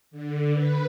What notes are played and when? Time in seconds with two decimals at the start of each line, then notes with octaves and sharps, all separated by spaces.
0.11 D3
0.52 B4